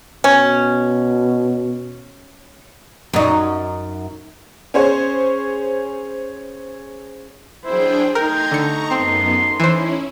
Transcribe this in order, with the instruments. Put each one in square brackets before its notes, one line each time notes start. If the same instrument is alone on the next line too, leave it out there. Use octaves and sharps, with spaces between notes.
[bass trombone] B2 [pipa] C#4
[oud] F#2 D#4
[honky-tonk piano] C#4 G#4 C5 C#5
[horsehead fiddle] F#3 C5 [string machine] D4 G#4 G5 [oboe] E4
[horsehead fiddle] A3 D#4 [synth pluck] A#4 [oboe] G5 [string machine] A#5 C6 G#6
[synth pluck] D3 C#7 [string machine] A#5 C#6
[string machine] F#2 B3 [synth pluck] C4 [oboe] C6
[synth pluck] E3 C5 [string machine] C#4 E4